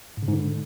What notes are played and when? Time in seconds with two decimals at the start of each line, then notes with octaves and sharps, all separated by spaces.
0.17 G#2
0.23 C#3
0.28 G#2
0.33 D3